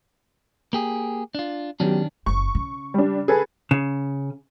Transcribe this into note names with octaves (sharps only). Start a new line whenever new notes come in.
A#3 G4 G#4
D4 F4
D#3 F#3 B3 C#4 D4 G4
F#1 C#6
C#3
G3 D4
G#4 A4 B4
C#3